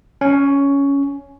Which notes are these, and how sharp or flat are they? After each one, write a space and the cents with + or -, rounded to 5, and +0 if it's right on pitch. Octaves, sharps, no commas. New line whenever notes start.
C#4 +10